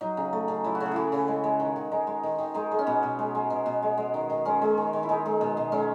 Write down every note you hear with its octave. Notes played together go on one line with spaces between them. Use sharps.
F#3 D#4
C#3
A3
C#3
F#3 E4
F#4
C#3
G#4
A3 E4 F#4
C#3
G#3
G#3
D#3
D#3
G#3 D#4
G#3
D#3
D#3
G#3 D#4
G#3
C#4
B2 B3
B2
G#3
G#3
B2
B2
G#3
G#3
D#3
D#3
G#3 C#4
G#3
D#3
D#3
E4
G#3 D#4
G#3
B2
B2
G#3 C#4